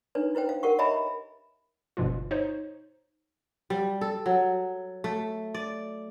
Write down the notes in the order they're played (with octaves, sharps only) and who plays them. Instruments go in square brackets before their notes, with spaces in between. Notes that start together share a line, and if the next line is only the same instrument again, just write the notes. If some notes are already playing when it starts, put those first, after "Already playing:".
[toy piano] D4 D#4 B4 C#5
E4 B4 C5 G5
F5
G4 A#4 F#5 C#6
C#5 D#5 E5 G#5 A#5 B5
[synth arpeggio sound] G1 G2 B2 F3 F4
D#4 C5 C#5
[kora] G3
A4
F#3
A3
D5